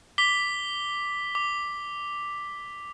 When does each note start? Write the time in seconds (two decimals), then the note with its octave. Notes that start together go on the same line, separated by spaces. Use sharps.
0.18 D6 B6 G7
1.35 D6